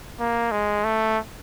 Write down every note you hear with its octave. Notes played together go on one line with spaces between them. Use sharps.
A#3
G#3
A3